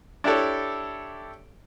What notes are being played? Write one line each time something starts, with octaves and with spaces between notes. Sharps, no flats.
D4 E4 G4 A4 C#5